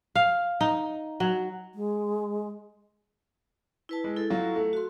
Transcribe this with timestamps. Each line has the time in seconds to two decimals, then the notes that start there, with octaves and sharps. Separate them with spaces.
0.15 F5
0.61 D#4
1.20 F#3
1.75 G#3
3.89 E4 B4 A5
4.04 G#3
4.16 E4 A4
4.30 F#3 F4 F#4
4.56 A3
4.73 F#4 C6